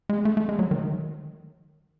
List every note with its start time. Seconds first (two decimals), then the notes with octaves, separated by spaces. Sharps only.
0.09 G#3
0.25 A3
0.37 A3
0.49 G#3
0.59 F#3
0.71 D#3